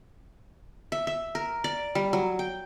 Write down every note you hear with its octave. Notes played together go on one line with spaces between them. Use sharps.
E5
E5
A#4
D5
G3
F#3
G5